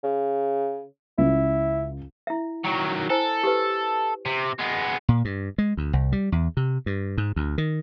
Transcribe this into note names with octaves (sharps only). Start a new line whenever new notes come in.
C#3
C#2 E4
E4 E5
D#3 F#3
E4 A4 C5 G#5
G4 B4
C3
G#3 B3
A#2
G2
G#3
D2
C2
G3
E2
C3
G2
G#2
D2
D#3